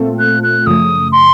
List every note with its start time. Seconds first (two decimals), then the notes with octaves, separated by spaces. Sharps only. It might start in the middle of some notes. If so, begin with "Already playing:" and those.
Already playing: A#2 A3 C4 F4 A4
0.19 F#6
0.43 F#6
0.66 F#2 C#3 F3 A3 D#6
1.12 C6